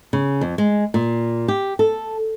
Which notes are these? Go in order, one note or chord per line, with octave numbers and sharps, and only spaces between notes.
C#3
F2
G#3
A#2
G4
A4